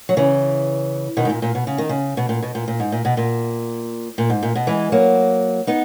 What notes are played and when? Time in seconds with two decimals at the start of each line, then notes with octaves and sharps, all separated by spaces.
0.09 F#3
0.17 C#3 E3
1.17 B2 D#3
1.25 G#2
1.29 A#2
1.42 A#2
1.55 B2
1.67 C#3
1.78 D#3
1.89 C#3
2.17 B2
2.29 A#2
2.42 B2
2.55 A#2
2.68 A#2
2.80 G#2
2.92 A#2
3.05 B2
3.17 A#2
4.18 A#2
4.30 G#2
4.43 A#2
4.55 B2
4.67 E3 G#3
4.92 F#3 A#3
5.67 B3 D#4